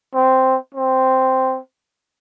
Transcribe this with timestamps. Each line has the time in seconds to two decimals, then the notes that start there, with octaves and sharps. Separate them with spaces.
0.14 C4
0.74 C4